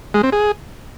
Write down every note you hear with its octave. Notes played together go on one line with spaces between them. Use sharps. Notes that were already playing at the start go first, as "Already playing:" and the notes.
G#3
C4
G#4